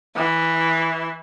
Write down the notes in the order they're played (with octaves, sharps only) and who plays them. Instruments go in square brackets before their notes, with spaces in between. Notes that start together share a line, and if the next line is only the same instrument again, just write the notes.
[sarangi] E3